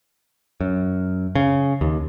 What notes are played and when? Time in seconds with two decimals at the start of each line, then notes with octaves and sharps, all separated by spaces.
0.61 F#2
1.35 C#3
1.81 D#2